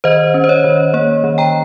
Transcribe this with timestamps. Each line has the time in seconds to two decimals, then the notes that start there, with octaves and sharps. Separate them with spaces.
0.04 D#3 C5 D#5
0.34 C#4
0.44 C5
0.49 C#5
0.64 D#3
0.94 A#3 C#5
1.24 D#3
1.38 G5 A#5